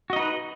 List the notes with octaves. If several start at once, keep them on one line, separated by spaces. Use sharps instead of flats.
D#4 F#4 B4 D#5